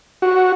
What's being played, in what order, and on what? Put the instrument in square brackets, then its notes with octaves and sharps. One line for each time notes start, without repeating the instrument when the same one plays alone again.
[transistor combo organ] F#4